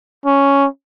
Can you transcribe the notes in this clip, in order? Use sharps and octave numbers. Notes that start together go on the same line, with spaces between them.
C#4